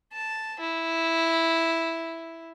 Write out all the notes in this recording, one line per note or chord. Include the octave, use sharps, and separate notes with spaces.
A5
E4